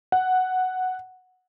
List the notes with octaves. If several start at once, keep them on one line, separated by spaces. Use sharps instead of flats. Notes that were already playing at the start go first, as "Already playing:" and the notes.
F#5